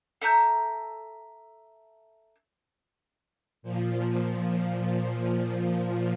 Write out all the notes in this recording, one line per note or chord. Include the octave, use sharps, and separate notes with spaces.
A4 E5 A#5 G6
A#2 F3